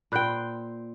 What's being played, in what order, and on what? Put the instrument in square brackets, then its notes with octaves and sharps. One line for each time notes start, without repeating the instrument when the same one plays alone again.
[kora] A#2 C5 G5 [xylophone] B5 F#6 G6